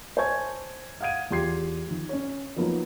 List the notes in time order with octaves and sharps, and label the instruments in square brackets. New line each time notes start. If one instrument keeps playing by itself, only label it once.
[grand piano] C5 C#5 G#5 A5 C#6 G#6
F5 F#5 D#6 G#6 D#7
E2 F4 G4 C6 G#6 C7
D#3 F3
C#4 C#5
F3 F#3 A#3 B3 D#4 F4